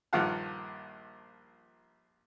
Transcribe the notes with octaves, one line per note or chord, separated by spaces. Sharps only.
A#1 G2 D#3 F3 F5 F#5